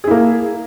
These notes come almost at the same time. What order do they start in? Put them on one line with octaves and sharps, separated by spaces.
G#4 E4 A#3